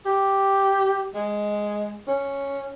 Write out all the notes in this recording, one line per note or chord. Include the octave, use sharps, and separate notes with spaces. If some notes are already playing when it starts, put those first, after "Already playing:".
G4
G#3
C#4